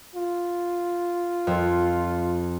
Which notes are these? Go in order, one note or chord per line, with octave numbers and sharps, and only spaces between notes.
F4
F2